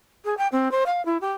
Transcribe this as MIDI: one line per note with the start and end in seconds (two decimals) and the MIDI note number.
0.25 0.34 68
0.38 0.48 79
0.52 0.71 60
0.71 0.84 72
0.86 1.04 77
1.05 1.17 64
1.21 1.33 67